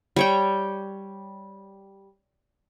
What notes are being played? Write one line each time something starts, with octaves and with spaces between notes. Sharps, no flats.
G3 C#5 G5